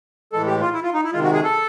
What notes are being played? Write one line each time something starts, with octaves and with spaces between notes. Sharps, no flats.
A2 E3 G#3 A4
G4
F4
E4
F4
D#4
E4
C3 D#3 G#3 F4
F#4
G#4
A4